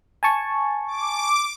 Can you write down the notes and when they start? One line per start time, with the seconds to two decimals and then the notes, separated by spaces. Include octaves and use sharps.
0.23 G#5 A5 C#6
0.87 D6